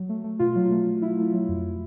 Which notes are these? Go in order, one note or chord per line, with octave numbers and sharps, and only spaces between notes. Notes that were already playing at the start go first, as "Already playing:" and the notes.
Already playing: F#3
A3
A3
B2 F4
F#3
A3
F#3
F#3 E4
A3
F#3
F2